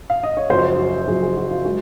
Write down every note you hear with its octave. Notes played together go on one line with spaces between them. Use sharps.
F5
D#5
C#5
F#1 F#2 F3 C5
F#4
F#1 F#2 F3 G#4
G#4
F#4
F4
G#3 F#4